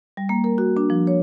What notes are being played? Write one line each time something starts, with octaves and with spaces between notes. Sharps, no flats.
G3
A#3
A#4
F#4
D4
F3
C#5